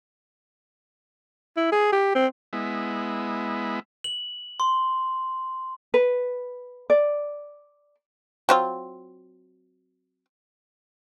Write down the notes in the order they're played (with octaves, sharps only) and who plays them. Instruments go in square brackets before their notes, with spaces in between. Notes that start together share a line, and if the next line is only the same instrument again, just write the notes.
[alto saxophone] E4
G#4
G4
C4
[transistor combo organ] G#3 B3 E4
[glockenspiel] F#7
C6
[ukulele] B4
D5
[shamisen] F#3 C4 F4